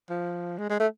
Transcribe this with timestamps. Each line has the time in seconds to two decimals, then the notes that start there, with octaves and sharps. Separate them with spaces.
0.10 F3
0.58 G#3
0.70 G#3
0.80 A3